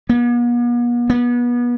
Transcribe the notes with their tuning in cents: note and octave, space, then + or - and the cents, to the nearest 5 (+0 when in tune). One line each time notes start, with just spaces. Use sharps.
B3 -45
B3 -30